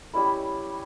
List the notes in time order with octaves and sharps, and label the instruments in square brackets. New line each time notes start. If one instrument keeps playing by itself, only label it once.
[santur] G3 C#4 E4 B5